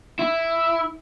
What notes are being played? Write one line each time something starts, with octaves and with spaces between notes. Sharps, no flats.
E4